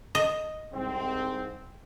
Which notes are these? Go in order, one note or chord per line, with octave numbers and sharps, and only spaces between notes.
D#5
C2 G#2 C4